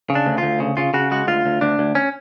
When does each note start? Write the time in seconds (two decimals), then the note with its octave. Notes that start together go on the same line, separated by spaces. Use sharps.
0.10 C#3
0.15 D4
0.26 D2
0.38 D2 F4
0.60 C#3
0.77 C#3 F4
0.94 C#3 F#4
1.11 G#3 F#4
1.27 D2 F4
1.46 D2
1.61 D2 D4
1.79 D2
1.95 C#4